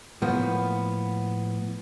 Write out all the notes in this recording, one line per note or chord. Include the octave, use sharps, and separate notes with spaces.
A2 F3 A#3 B3